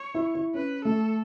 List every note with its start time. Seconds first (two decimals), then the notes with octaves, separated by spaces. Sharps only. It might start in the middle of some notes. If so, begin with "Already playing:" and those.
Already playing: C#5
0.15 E4
0.35 E4
0.54 C#4 B4
0.85 A3 A4